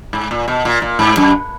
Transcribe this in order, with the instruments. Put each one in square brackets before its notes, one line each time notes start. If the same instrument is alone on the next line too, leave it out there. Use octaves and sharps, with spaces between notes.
[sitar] G#2
A#2
B2
A#2
A#2
G#2
F#2